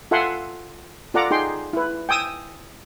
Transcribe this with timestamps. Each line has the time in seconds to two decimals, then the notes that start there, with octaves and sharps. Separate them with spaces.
0.11 F4 A4 E5 F#5 G#5 C6
1.14 F4 A4 D5 F#5 A#5 D6
1.31 D#4 G#4 G5 C6
1.73 E4 B4
2.09 G5 G#5 D#6 E6